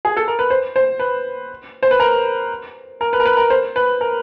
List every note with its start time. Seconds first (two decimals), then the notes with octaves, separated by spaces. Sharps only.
0.05 G#4
0.17 A4
0.28 A#4
0.39 B4
0.50 C5
0.76 C5
0.99 B4
1.83 C5
1.91 B4
2.00 A#4
3.01 A#4
3.13 B4
3.20 A#4
3.26 B4
3.37 A#4
3.50 C5
3.76 B4
4.01 A#4